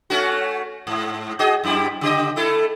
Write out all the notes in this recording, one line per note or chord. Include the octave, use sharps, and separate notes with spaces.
A3 C#4 F#4
G#2
F#4 G#4 D#5
F#2 E4 G4
C#3 G4 D#5
A3 E4 A4